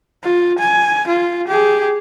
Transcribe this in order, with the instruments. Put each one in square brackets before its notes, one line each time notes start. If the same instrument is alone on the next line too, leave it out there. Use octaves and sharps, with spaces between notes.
[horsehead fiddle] F4
G#5
F4
G4 G#4